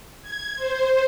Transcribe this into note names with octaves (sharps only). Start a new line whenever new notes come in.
G#6
C5